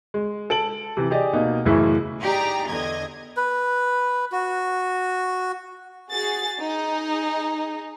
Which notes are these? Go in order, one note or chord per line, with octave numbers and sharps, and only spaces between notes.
G#3
A4 D7 F#7
C3 E3
G4 G#4 D5 D#5
B2 A#3 D#4
F#2 A2 C#3 E3 E4
D#4 G4 G#4 D5 G5 A#5
E2 D3 D#5 G#6
B4
F#4
F#4 G#4 A6
D#4 G#4